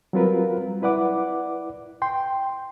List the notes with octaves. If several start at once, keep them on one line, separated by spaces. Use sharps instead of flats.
F#3 G3 C4 F4 A#4 B4
E4 B4 D5 F#5 D6
G5 C6